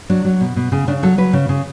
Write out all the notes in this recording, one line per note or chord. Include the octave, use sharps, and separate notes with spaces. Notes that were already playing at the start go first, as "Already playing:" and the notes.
F#3 D4
F#3
B2
B2
C#3
C#3 D4
F#3 A4
F#3 B4
C#3
C#3